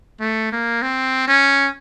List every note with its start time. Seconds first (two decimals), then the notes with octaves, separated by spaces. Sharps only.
0.20 A3
0.52 A#3
0.82 C4
1.28 C#4